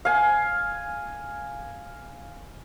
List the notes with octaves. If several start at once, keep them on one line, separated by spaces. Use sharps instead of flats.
F5 G#5